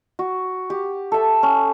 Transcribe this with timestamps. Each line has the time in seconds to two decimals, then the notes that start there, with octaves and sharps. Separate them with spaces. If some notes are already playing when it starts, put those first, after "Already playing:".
0.19 F#4
0.70 G4
1.12 A4 E5
1.43 C#4